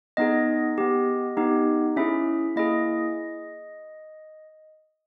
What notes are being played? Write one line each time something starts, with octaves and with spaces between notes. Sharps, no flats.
B3 D#4 G#4 D#5
B3 G4
B3 D#4 G4
C#4 E4 G#4 E5
A#3 E4 G#4 D#5